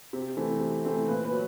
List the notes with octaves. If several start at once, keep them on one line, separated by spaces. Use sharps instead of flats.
C3
E3 A3 C4
C3
E3 A3 C4
A#2 B4
B4
F#3